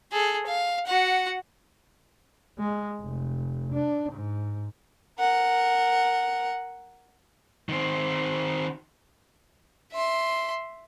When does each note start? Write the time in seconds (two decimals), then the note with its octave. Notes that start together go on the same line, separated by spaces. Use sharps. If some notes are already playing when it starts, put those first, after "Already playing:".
0.12 G#4 A4
0.46 F5
0.87 F#4 F#5
2.59 G#3
3.01 F1
3.72 D4
4.12 G#2
5.19 A#4 F#5
7.69 D#3 C4
9.93 E5 C6